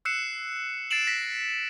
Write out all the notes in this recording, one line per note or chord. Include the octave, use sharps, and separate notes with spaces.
E6 F#6 C7 C#7 E7
A6 C7 D7 E7 F#7
A#6 B6